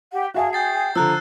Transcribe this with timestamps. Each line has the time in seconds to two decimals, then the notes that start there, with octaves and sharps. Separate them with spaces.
0.12 G4 F#5
0.34 F#4 G#4 E5 F5 A5
0.53 G5 G6 A6 C7
0.95 D3 F3 A#5 E6 F#6